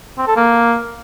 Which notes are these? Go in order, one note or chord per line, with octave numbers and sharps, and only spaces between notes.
C4
A4
A#3